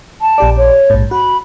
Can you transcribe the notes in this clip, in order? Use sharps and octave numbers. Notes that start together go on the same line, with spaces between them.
A5
A#1 G4 D5
C#5
A#1 G#2
F#4 B5